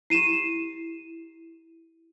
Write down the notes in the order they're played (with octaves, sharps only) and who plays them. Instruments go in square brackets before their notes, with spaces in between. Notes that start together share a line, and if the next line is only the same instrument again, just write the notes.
[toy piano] E4 G4 [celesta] C7 D#7 E7